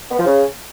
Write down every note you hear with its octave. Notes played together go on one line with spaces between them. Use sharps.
B3
F3
C#3